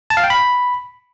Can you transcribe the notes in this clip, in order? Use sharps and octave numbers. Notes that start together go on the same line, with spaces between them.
A5
F5
G5
B5